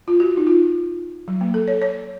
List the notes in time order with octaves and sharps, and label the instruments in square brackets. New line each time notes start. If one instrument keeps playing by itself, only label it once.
[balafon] F4
F#4
D#4
F4
F#3
A#3
A4
C#5
C#5